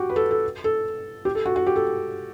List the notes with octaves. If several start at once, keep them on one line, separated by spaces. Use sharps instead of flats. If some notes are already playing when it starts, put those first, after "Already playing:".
Already playing: F#4 G4
B4
A4
A4
A4
G4
A4
F#4
F#4
G4
A4